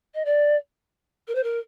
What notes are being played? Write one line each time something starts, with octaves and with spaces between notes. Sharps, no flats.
D#5
D5
A#4
C5
A#4